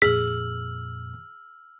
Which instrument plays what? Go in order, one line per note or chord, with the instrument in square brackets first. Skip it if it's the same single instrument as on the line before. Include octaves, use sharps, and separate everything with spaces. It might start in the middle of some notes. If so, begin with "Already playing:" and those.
[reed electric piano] F2 A#2 [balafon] G#4 [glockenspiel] E6 F6 F#7 [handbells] B6